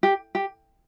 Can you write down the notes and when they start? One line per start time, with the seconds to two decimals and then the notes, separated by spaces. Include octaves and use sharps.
0.03 G4
0.35 G4